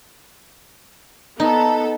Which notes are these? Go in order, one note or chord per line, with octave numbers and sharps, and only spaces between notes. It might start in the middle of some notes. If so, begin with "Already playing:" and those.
B3 D#4 A4